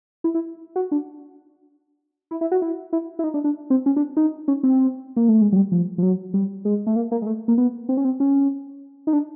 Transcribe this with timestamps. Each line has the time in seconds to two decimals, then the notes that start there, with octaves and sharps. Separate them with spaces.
0.24 E4
0.34 E4
0.76 F#4
0.92 D4
2.31 E4
2.41 E4
2.52 F#4
2.62 E4
2.93 E4
3.19 E4
3.24 D#4
3.34 D4
3.44 D4
3.70 C4
3.86 C#4
3.96 D4
4.17 D#4
4.48 C#4
4.63 C4
5.17 A#3
5.29 A3
5.41 G#3
5.52 F#3
5.56 G3
5.72 F3
5.98 F3
6.03 F#3
6.34 G3
6.65 G#3
6.87 A3
6.96 A#3
7.12 A#3
7.22 G#3
7.27 A3
7.48 A#3
7.58 B3
7.89 C4
7.97 C#4
8.04 C4
8.20 C#4
9.07 D#4
9.13 D4